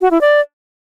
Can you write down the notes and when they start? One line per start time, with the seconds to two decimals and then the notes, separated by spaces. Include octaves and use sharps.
0.01 F#4
0.11 E4
0.21 D5